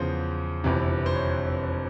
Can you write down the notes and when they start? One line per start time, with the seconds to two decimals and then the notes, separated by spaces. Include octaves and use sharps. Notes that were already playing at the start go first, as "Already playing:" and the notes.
Already playing: E2 C#3 F3 C5
0.64 G1 F2 C3 E3
1.06 C5
1.15 C#5